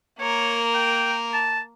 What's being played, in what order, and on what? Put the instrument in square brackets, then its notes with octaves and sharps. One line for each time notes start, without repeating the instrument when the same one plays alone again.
[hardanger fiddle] A#3 A#4 [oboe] C#5
[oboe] G5
A5